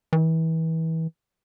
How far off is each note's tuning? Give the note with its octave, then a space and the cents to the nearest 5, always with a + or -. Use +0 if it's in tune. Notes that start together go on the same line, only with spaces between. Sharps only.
E3 -30